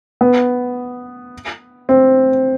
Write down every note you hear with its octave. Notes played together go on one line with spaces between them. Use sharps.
B3
C4